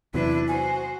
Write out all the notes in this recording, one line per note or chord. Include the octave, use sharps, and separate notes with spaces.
E2 C3 F#3 D4 E4 B4
F#4 C5 G#5